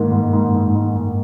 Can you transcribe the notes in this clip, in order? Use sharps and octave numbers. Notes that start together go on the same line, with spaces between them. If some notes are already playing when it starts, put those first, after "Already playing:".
Already playing: G#2 D#3 A#3
G#2
G#2
G#2
G#2
G#2